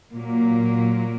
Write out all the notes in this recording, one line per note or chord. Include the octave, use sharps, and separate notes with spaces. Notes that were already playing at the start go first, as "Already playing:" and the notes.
A#2 F#3 A#3